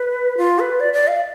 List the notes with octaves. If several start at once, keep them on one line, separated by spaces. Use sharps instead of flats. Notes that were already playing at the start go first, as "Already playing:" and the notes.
Already playing: B4
F4
B4
D5
D5
F5